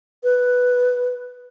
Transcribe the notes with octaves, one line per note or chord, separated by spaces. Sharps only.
B4